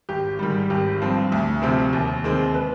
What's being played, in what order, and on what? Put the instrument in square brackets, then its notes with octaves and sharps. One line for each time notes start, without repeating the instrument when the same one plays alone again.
[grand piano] G#1 G4
G#2 D#3 G3
G#1 G4
G2 F3 C4
D2
C3 F3 C4
D#2
D#3 G#3 C4
B4